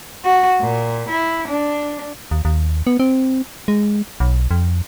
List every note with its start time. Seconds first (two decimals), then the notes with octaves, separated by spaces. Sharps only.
0.25 F#4
0.61 A#2
1.09 E4
1.48 D4
2.31 D#2
2.45 D#2
2.87 B3
3.00 C4
3.68 G#3
4.20 B1
4.51 F2